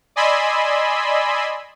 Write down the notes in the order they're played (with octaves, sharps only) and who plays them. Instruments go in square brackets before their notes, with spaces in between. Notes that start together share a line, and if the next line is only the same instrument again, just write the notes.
[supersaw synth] D5 D#5 G#5 B5 C6 E6